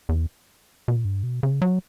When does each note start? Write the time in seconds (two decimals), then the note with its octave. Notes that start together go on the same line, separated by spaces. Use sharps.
0.09 E2
0.88 B2
0.96 A#2
1.05 G2
1.23 B2
1.43 C#3
1.62 F#3